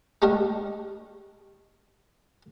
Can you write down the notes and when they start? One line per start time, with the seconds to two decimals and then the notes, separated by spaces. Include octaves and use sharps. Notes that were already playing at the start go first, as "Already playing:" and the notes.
0.22 G#3 A3 D4 G4 A#4 D#5